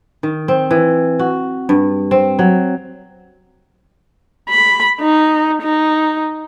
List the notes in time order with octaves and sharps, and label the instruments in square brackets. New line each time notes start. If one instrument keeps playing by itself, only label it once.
[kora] D#3
C4
E3
F#4
G2
C4
F#3
[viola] B5
D#4
D#4